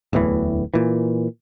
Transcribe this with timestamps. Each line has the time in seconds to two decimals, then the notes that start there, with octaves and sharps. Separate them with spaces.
0.13 D1 E2 A2 E3
0.74 A#2 E3